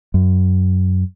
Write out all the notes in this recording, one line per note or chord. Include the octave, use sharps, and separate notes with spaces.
F#2